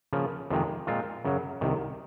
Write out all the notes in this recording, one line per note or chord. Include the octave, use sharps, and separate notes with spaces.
C#3 F3 A#3
F2 C3 D#3 G#3
A#2 G#3 C4 F4
F#2 C#3 F#3
C2 C3 D#3